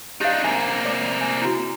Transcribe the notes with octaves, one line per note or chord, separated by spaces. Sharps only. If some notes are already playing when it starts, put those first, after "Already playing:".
D4 D#4 G4 F5
C3 A#3 G#5
D5 D6
G#5
E4 F#4